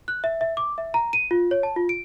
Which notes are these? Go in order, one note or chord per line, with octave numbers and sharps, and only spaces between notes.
F#6
E5
E5
D6
E5
A#5
D#7
F4
C#5
A5
F4
D7